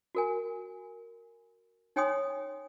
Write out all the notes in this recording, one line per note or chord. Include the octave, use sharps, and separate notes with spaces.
F#4 A#4 G#5
D#4 C#5 G5 G#5 C6 D#6